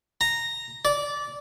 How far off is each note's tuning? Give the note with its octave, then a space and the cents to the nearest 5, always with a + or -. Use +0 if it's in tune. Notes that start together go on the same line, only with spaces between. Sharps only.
A#5 -10
D5 -15